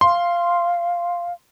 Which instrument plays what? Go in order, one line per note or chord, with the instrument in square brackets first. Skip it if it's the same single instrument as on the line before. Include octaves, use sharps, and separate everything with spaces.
[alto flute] F5 [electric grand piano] C6